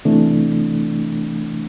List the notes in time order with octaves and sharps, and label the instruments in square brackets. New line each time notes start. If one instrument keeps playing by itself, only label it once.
[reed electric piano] C2 C3 E3 A3 D4